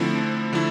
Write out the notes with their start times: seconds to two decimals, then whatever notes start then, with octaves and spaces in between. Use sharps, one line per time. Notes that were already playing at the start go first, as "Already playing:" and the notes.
Already playing: D3 F3 A3 C4 E4
0.53 D3 F3 A3 E4